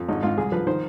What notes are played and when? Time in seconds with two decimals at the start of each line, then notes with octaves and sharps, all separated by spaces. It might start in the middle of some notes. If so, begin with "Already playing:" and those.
Already playing: F2
0.08 G#1 D#4
0.23 G#2 F4
0.38 C2 G#4
0.52 F3 B4
0.67 D#3 C5